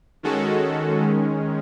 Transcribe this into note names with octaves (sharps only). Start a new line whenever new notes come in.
D#3 G#3 C#4 F#4 A4
D#3 G#3 C#4